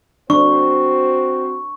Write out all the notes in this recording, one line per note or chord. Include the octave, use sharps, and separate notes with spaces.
C4 D4 F#4 C5 C#6